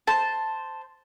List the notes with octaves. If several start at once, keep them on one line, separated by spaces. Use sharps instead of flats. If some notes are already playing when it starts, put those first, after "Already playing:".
C5 A5